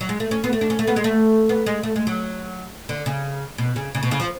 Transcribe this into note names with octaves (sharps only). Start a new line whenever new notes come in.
F#3
G#3
A3
C#4
B3
A3
D4
C#4
A3
B3
G#3
A3
B3
G#3
A3
G#3
F#3
D3
C#3
B2
C#3
C#3
B2
C#3
F3